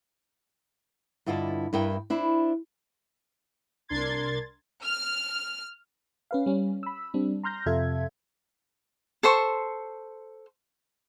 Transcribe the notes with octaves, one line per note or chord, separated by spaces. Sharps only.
G2 D3 E4 F4 D#5 A5
G2 E4 A#4 G5
D4 E4 C5
C2 D4 A#4 C6 G#6 A6
F6
C#4 B4 F5
G3 C#4
B5 E6
G3 C4 D4
A#5 C6 F6 G6 A#6
F2 C3 F4 A4 E5 G#6
A4 C5 C6 C#6